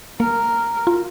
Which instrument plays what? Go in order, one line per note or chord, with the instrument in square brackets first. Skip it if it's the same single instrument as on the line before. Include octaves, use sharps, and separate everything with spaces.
[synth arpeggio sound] A#3 [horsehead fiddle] A#4
[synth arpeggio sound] F4